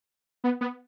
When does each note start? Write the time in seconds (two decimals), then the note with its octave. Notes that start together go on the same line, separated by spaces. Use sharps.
0.44 B3
0.61 B3